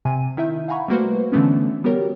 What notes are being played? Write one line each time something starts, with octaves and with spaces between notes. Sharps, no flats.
C3 G#5 D#7
D#3 E4 E5 G6
F5 F#5 G#5 A#5 B5 C#6
G3 A3 A#3 F#4 B4 C5
D3 E3 F3 A3 B3 C#4
G3 B3 F#4 G4 A#4 C#5